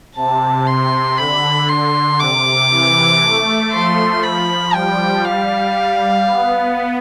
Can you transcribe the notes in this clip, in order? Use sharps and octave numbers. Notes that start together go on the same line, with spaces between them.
C3 A5
C3 C6
D3 B5
C6
C3 D6
E3
A3
F3 C6
B5
G3 G5
G3 F5
B3